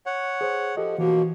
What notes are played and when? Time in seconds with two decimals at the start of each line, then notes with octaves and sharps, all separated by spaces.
0.06 C#5 F#5
0.41 G#4 C5
0.77 F3 G4 A4 D#5
0.98 B2 E3 F3 A#3 F#4